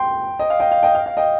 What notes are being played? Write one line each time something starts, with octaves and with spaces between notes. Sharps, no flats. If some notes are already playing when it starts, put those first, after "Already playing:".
Already playing: G5 C6
D#5
F5
D#5 G5
F5
D#5 G5
F5
F5
D#5 G5